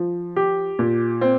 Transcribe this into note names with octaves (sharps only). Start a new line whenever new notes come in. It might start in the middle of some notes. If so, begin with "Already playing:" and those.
Already playing: F3
G4
A#2
C4